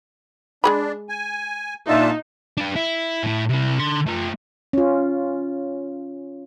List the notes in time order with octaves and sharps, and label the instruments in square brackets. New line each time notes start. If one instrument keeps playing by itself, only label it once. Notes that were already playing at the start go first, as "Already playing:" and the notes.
[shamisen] G#3 G#4 B5 [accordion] D4
[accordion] G#5
[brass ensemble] A#2 E5 [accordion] D4 F4 A5 [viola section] D#4
[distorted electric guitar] D4 B4
E4
A2 E4
C3 E4
D3 C6
A3 F4
[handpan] C#4 F4